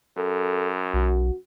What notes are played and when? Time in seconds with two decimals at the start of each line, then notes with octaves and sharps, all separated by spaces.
0.17 F#2 A4
0.93 B1 F#4